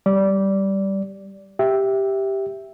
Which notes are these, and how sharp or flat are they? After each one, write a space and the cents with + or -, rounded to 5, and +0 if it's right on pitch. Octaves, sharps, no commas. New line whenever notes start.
G3 -5 D5 -15
G4 +0 E5 -5